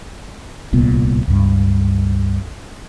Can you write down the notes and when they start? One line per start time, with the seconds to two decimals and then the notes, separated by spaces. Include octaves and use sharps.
0.72 D1 C2 A#2 B3
1.27 C#2 G2